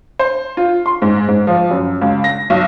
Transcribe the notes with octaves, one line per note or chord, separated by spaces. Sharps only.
C5
F4
C6
G#2
G#2
F3
F#2
C#2
A#6
B1